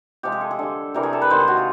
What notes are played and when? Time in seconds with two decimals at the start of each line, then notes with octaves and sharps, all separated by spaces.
0.23 C3 F3 G#3 G4
0.32 G#4
0.41 A4
0.51 G#4
0.59 D3 G3 A4
0.94 C3 E3 G3 A#4
1.03 G#4
1.13 A4
1.22 B4
1.30 C3 D#3 G#3 C5
1.40 G#4
1.48 F#4
1.57 F4